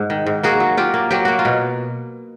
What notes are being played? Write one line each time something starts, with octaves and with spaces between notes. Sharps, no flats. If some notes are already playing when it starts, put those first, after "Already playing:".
Already playing: G#2
D#3
G#2
A#3 F#4 G#4
F#3
F#3 F4 G4
A#3
F#3 G4
A#3 F#4
F4
B2